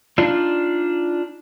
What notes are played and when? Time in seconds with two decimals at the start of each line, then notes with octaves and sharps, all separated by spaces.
0.18 D4 D#4 F4 D5